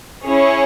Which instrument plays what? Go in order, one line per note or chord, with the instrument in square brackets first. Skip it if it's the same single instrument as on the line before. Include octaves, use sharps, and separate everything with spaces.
[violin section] C#4 E4 G#4 C#5